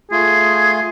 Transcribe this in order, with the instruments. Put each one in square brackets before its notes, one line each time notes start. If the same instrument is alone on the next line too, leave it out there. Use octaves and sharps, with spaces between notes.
[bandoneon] A3 F4 [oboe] G#4